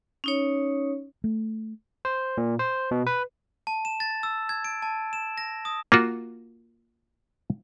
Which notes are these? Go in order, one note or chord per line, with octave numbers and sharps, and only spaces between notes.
C#4 D#4 C#5
A3
C5
A#2
C5
B2
B4
A5
E7
A6
E6
G#6
D7
A5
E7
A#6
D#6
A#3 F4 F#4